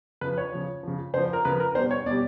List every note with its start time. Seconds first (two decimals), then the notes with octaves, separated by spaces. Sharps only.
0.21 C#3 F3 B4
0.38 C#5
0.52 C#3 F3
0.83 C#3 F3
1.14 C#3 F3 C5
1.33 A#4
1.45 C#3 F3 B4
1.60 A#4
1.75 B2 G3 C5
1.91 C#5
2.06 B2 D5
2.11 G3